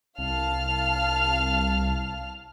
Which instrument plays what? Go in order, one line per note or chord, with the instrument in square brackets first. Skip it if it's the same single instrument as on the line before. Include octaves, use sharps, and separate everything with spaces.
[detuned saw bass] C2 [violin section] F5 A5 F6